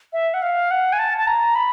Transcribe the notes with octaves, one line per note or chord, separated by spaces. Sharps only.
E5
F#5
F5
F#5
G#5
A5
A5
A#5
B5